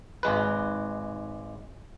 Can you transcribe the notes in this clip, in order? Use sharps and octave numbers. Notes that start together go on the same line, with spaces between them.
G#1 G#3 B4